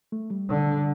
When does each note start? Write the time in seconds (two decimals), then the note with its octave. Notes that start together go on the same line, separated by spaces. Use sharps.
0.12 A3
0.30 G3
0.49 D3